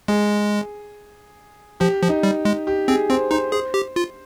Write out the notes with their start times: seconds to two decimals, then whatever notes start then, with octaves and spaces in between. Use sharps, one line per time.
0.08 G#3 G#4
1.80 F3 G4
2.02 F3
2.09 D#4
2.23 G3
2.45 G#3
2.67 G4
2.88 C4 G#4
3.09 C4 C5
3.31 D#4 C5
3.52 G#4 C5
3.74 G4
3.96 F4